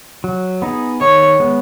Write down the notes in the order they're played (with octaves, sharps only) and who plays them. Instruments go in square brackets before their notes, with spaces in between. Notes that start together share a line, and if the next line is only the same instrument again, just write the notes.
[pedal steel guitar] F#3
B3 D#4 G#4
[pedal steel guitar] D#3 [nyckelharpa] C#5
[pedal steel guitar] G#3 B3